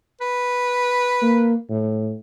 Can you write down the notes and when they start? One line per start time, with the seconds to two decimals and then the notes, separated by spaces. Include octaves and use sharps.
0.21 B4
1.22 A#3
1.69 A2